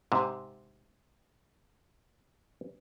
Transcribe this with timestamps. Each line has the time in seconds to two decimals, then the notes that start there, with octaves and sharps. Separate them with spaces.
0.12 G#2 C3